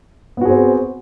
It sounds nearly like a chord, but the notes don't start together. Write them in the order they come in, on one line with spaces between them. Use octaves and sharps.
B3 F#4 G#4 C4